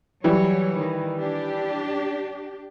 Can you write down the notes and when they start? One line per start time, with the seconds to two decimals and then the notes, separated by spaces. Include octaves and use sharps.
0.24 E3 F#3 G3 C#5
0.79 D#3
1.18 D4 G4